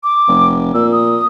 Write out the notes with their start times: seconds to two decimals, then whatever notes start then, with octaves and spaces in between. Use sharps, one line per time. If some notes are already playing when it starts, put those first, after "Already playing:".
0.04 D6
0.27 F1
0.74 A#2 E6
0.92 D#6